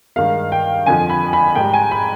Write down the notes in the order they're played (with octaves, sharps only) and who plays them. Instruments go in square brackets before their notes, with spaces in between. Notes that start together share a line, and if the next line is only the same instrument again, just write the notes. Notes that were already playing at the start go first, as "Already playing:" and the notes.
[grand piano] G2 D#3 G#3 F5
G5
F2 D3 F3 G#5
B5
B5
G#2 G3 G5
G#5
B5